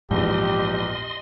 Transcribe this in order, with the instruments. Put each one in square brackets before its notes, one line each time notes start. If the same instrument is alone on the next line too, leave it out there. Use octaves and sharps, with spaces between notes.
[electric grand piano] A#1 E2 [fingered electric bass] G#2 [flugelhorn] G4 [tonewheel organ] D#5 C6